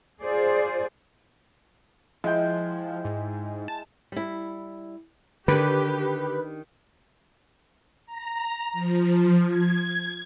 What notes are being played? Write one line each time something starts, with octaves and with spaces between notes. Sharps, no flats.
F4 G#4 C5 D5
F3 G#3 E4 G5
G#2
A5
G3 E4
D3 D#3 D4 G4 B4
A#5
F3
G#6